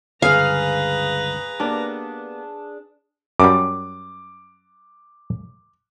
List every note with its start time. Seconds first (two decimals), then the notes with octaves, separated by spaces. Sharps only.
0.22 C#2 G2 D3 G#4 B4 F5 A#5
1.60 A#3 B3 D4 G4
3.40 F#2 G3 D6